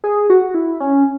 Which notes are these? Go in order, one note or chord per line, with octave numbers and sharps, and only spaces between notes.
G#4
F#4
E4
C#4